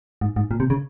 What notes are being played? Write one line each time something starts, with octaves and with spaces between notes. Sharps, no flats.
G#2
G#2
A#2
C3
C#3